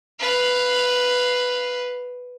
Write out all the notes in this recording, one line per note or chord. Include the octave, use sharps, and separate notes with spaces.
B4 F5